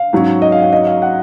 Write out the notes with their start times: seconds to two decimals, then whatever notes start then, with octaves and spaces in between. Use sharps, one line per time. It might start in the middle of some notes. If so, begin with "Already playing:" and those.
Already playing: F5
0.13 G#2 F#3 C#4
0.42 D#5
0.52 F5
0.62 F5
0.73 D#5
0.87 F5
1.02 F#5